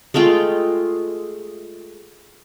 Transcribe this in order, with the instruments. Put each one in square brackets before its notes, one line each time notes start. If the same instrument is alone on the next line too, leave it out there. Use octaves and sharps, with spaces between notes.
[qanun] G#3 A3 F4 G5